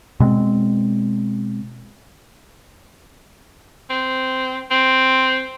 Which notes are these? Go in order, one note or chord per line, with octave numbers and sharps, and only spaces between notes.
B2 G#3 C4
C4
C4